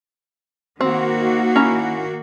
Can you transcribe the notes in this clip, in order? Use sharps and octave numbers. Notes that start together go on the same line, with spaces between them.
D#3 A#3 C4 F#4
C#4 E4 A#5